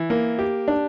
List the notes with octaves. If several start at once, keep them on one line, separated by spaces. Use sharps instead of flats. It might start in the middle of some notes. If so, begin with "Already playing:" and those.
Already playing: E3
A#3
G4
D4